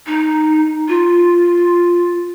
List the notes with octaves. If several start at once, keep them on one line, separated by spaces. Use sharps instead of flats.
D#4
F4